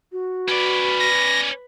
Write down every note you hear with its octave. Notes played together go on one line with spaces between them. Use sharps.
F#4
C#4 B4 D5
A#6